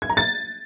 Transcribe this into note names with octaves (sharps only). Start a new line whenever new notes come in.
G#6
A#5
A6